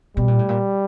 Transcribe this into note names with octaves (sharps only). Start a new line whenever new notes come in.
B2 G3
A#2
A2
A#2